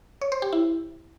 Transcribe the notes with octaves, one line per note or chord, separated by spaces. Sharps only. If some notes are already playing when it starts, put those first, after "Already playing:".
C#5
C5
G4
E4